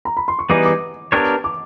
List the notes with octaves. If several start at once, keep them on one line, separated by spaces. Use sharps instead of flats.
A#5
B5
C6
C#6
E3 G3 B3 D#4 G#4 D6
D6
B3 D4 G4 A#4 C#5
D6